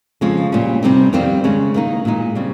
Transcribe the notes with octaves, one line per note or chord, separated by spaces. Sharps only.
F2 C#3 F3 G#3
A#2 G3 C#4
C3 G3 C4 D#4
F2 D#3 G3 C4
C#3 G#3 C#4
D#3 A#3 D#4
A#2 G#3 D#4
C#3 G3 C4